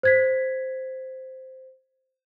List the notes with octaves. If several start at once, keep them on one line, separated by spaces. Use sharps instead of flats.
C5 G#6 B6